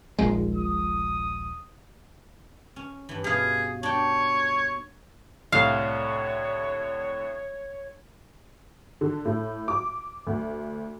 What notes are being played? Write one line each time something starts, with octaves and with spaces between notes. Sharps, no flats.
D#1 A#1 G#3
D#6
C#4
G2 E3
B2 G#4 F5
D4 C#5 G5
C2 A2 D3 C#5 F5
D3
A2
D6
D2